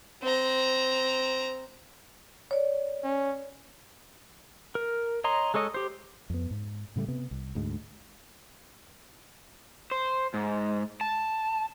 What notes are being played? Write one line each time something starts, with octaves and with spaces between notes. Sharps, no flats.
C4 A#5
C#5 D5
C#4
A#4
C#5 D#5 A#5 C6
G#3 A4 C#5 D#5
G4 C5
F2 B3
G#2
A2 C#3 G3 A3
C3 B3
C2
D2 G#2 G#3
C5
G#2
A5